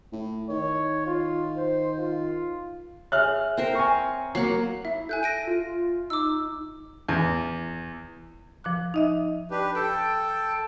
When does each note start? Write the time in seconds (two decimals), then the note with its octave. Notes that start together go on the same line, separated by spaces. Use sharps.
0.13 A2
0.49 D#3 C#5
1.07 F4
1.57 C5
1.99 F4
3.12 G#4 C#5 E5 F6 F#6
3.57 C4 A#4 C5
3.75 G#5 C#6
4.35 F#3 A#3 F#5 C7
4.85 E4 E5
5.09 A4 G#5 F#6 G6
5.23 A#6 D7 D#7
5.47 F4
6.10 D#4 D6 E6
7.08 E2
8.64 F3 D6 F#6
8.94 D#4 D#5 E5
9.51 D4 G4 B4
9.75 A4 G5 A5 G6